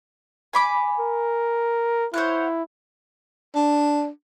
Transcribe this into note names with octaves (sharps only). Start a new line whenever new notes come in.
G#5 B5 D6
A#4
E4 C5 C#5 F#5
D4